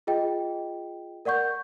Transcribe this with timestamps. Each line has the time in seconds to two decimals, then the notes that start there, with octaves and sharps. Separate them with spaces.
0.07 F4 G#4 D#5 G5
1.25 A#4 D5 F#5 C#6 G6